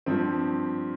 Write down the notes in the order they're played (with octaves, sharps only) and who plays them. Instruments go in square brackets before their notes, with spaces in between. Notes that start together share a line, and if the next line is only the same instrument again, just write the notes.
[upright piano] G2 F3 C4